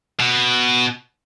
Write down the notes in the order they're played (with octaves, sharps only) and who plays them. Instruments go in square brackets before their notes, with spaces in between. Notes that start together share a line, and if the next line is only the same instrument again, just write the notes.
[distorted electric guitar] B2